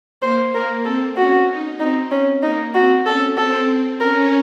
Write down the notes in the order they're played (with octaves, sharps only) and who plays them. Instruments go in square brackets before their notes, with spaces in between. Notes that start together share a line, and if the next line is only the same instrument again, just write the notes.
[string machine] A#3 [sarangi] C5
[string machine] A#3 [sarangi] A#4
[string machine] C4 [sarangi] A4
[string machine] C#4 [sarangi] F#4
[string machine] D#4
[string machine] C4 [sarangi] D#4
[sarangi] C#4
[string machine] A#3 [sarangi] D#4
[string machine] C4 [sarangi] F#4
[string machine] C#4 [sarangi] A4
[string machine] C4 [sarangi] A4
[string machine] C#4 [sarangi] A#4